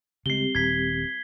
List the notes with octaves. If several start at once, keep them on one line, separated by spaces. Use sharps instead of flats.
C#3 G3 G#3 C4 G4 C7 G7
D#1 G#6 B6